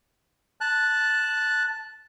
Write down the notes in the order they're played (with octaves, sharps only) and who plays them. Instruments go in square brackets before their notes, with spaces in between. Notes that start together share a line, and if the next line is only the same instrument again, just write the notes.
[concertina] A5 F#6